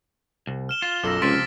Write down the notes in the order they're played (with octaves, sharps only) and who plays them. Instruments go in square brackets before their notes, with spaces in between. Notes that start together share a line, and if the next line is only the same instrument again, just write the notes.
[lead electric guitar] C2
[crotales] F6 E7 G7
[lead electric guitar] F4
[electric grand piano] B1 F4 A4 [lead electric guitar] F#2 [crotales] D6 E6 A#6
[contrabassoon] C#2 [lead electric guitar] C3 F3 [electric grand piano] C6 [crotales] A6 B6 D7